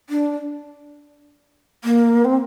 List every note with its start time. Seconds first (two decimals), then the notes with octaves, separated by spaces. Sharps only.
0.10 D4
1.84 A#3
2.25 C4